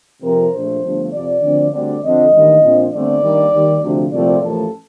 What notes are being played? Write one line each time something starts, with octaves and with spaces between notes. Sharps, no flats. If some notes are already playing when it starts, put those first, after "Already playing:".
F2 C3 F3 C4 A#4
A#1 A#2 A3 C5
G1 G2 F3 A3
F2 C3 F3 D5
D2 D3 F3 C4
D2 D3 G3 C4 D5
F2 D3 F3 C4 D#5
A1 G2 D#3 G3 A#3
A#1 A#2 F3 C4
G1 G2 D3 A3 C4 D5
G2 D#3 G3 A#3
D#2 D#3 G3
D2 C3 F3 C4
C2 A#2 F3 A3 C4 D5
A1 A2 F3 A#3 A4